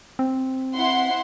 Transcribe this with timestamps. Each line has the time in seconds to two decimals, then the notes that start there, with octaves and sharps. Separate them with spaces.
0.19 C4
0.75 E4 F#5 C6